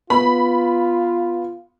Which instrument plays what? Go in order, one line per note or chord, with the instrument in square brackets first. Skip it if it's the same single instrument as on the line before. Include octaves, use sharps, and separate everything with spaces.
[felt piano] B3 [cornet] F4 [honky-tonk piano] B5